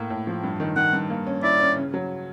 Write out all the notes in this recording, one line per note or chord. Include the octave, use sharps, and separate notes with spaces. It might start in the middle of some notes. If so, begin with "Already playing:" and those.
Already playing: A2 A#3
A2
F3
G2
D#3
D#3 F#5
G2
A#3
C#4
E4 D5
C#4
C#3
F#3